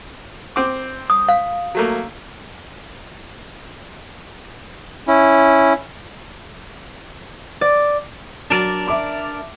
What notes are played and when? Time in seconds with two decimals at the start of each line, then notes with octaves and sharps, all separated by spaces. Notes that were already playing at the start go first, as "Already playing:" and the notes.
0.56 C4 D6
1.10 D#6
1.29 F5
1.75 F#3 A3 A#3
5.08 C#4 E4
7.61 D5
8.50 F#3 D4 A#4 D5
8.88 E5 D6